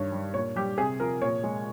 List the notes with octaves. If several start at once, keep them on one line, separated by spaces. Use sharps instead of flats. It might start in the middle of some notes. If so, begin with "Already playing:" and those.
Already playing: G2 D#3 C#5
G3
A#2 C#5
G3 G4
C3 G#4
F3 A#4
A#2 C#5
G#3